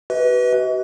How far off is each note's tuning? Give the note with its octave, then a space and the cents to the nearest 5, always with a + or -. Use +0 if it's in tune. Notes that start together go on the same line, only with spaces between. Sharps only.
F#4 +40 B4 +0 D#5 +40